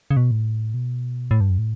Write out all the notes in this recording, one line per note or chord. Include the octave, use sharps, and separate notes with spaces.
C#3
B2
A2
B2
A2
G2
F#2
A2